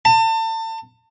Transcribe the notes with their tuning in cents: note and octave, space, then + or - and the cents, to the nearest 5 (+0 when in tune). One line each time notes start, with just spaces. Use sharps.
A5 +35